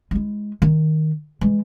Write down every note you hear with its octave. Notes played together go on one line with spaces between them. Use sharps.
G#3 E4
D#3
E3 G#3